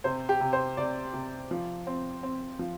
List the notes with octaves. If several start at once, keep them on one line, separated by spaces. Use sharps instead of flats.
C3 C5
G4
C3
C5
C3 D5
C3
F3
C4
C4
F3